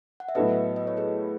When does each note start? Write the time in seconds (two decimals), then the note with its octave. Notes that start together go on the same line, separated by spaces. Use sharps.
0.20 F#5
0.29 E5
0.35 A2 F#3 B3 F#4 A4 B4 D#5
0.76 D#5
0.87 C#5
0.97 G#4 B4